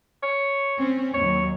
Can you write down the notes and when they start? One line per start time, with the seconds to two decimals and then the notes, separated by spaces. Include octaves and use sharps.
0.23 C#5
0.76 C4 C#4
1.14 D#2 F#3 C#5